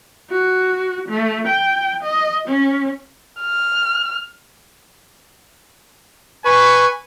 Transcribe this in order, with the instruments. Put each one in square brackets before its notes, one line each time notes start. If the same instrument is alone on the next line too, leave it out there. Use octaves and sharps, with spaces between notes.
[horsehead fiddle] F#4
A3
G5
D#5
C#4
[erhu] F6
[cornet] B4 [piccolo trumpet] G#5 [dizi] C#6